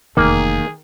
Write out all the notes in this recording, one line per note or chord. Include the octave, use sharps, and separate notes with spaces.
F1 E2 D#3 A#3 G#4